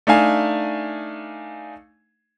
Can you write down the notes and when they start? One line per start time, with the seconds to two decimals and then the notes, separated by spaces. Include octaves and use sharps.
0.07 A3 D4 D#4 F5 G#5